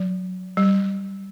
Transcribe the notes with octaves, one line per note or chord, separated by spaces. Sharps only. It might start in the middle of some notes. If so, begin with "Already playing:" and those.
Already playing: F#3
G3